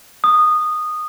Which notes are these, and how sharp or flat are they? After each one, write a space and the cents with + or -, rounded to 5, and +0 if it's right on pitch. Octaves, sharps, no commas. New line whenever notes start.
D#6 -15